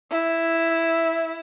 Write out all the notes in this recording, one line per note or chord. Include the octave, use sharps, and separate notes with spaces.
E4